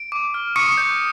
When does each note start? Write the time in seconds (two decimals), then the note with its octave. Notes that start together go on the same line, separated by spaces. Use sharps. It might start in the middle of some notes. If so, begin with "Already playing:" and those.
Already playing: D7
0.12 D6
0.34 F6
0.56 C#6 D#6 C#7
0.77 G6